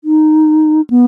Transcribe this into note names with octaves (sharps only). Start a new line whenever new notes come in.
D#4
B3